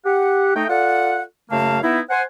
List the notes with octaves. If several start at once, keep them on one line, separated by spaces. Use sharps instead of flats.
G4 F#5
A3 D#4 G5
F4 A4 D5 F#5
F#2 C#3 A3 A#3 F5 A5
B3 D#4 E4
C5 F#5 G#5